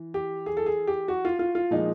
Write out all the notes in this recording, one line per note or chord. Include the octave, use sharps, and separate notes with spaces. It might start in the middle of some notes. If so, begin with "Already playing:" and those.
Already playing: E3
G4
G#4
A4
G#4
G4
F#4
F4
F4
F4
A#2 F3 G#3 D#4